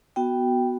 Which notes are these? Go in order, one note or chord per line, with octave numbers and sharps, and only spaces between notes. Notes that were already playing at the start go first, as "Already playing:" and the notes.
B3 F#4 G5